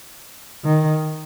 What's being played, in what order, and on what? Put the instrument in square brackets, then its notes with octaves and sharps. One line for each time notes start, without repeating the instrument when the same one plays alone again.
[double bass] D#3